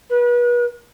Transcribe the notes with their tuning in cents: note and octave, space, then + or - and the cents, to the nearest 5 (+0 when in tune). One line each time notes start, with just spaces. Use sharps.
B4 -35